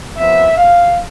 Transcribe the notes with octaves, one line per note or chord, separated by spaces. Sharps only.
F2 C3 F3 B3 E5
F5